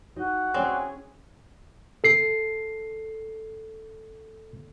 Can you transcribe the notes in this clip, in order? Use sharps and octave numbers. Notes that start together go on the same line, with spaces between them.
D#4 F#4 D#5
C4 C#4 G#4 C#5 D5
A4 C7